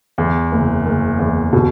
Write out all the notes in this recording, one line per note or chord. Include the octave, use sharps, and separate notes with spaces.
E2
F#1
F#1
E2
B2